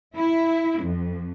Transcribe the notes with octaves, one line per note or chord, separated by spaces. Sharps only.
E4
F2